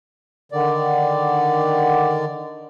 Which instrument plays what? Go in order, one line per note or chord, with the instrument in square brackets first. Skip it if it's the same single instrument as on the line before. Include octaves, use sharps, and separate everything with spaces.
[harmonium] D3 D#3 D5